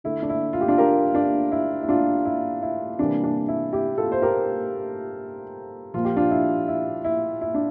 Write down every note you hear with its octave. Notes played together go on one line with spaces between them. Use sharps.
D3 A3 E4
D4
E4
F4
G4
D4 F4
G4 A#4
D4
E4
E4
D4 F4
E4
E4
C3 E3 G3 A#3 D4
D4
E4
E4 G4
F4 A4
C5
G4 A#4
A#2 F3 A#3 F4
G4
D4 F4
E4
E4
E4
E4
D4